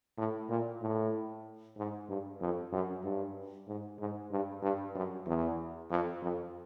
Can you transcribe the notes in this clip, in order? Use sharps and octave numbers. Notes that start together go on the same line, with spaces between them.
A2
A#2
A2
G#2
G2
F2
F#2
G2
G#2
G#2
G2
G2
F#2
E2
F2
F2